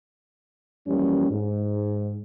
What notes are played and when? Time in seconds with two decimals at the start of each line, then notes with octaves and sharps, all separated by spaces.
0.87 F#2 E3 F3 G3 A#3 C#4
1.30 G#2